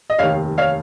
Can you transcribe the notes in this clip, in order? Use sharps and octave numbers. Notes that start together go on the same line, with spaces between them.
D#5
F1 D#2 D#3 C#5 F5
C#5 F5